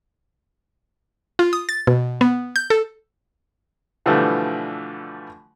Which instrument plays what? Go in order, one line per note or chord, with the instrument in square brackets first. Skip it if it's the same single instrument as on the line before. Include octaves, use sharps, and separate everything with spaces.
[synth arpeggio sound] F4
D#6
A6
B2
B3
G6
A4
[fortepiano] B2 D3 E3 F3 G3 A3